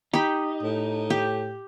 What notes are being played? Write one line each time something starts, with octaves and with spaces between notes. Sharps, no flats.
D#4 G4 B5
A2
G4